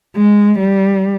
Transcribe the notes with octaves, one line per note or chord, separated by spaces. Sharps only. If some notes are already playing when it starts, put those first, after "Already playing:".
G#3
G3